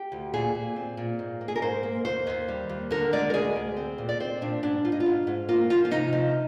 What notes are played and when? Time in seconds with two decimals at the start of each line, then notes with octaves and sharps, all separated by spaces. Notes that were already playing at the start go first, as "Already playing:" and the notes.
Already playing: G4
0.12 D2
0.33 A#2 G#4
0.55 A#2
0.76 C4
0.97 A#2
1.19 G#2
1.41 A#3
1.48 G#4
1.56 A#4
1.62 G#2 C5
1.83 A#3
2.05 D#2 C5
2.27 D#2
2.48 G3
2.69 D#2
2.91 D3 A#4
3.13 G#3 D5
3.30 A#4
3.34 D2 G#4
3.56 D2
3.77 C4
3.98 A#2
4.09 D5
4.20 C4 C5
4.41 A#2 D4
4.63 G#2 D4
4.84 G#2 F4
4.92 D#4
5.00 F4
5.06 G#2
5.27 G#2
5.49 A#3 F4
5.70 F3 F4
5.85 F4
5.91 C3 D#4
6.13 F3